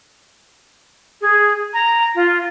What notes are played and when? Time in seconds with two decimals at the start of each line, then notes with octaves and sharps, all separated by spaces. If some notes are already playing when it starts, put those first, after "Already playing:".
1.21 G#4
1.74 A#5
2.15 F4